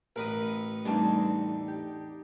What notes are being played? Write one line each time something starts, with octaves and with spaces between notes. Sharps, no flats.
A1 A#4 B4 D#6
E2 G3 A3 C4 D4 D#4 A5
G4